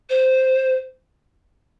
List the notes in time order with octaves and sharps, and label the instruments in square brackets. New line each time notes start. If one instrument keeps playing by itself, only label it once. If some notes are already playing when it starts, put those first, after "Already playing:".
[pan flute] C5